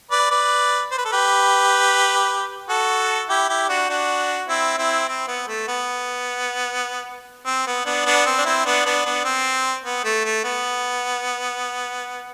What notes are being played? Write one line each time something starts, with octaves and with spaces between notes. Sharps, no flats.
B4 D5
B4 D5
C5
B4
A4
G4 B4
F#4 A4
E4 G4
E4 G4
D4 F#4
D4 F#4
C4 E4
C4 E4
C4
B3
A3
B3
C4
B3
B3 D4
B3 D4
C4
D4
C4 E4
B3 D4
B3 D4
B3 D4
C4
B3
A3
A3
B3